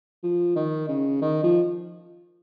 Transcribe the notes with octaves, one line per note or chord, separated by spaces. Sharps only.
F3
D#3
C#3
D#3
F3